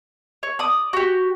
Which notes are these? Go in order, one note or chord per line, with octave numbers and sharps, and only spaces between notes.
C#5
D5 D#6
F#4 G4